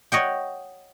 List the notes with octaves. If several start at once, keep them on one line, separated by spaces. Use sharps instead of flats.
C#5 D#5 F#5 G5